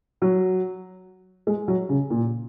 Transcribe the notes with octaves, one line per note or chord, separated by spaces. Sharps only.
F#3
G#3
F#3
C#3
A#2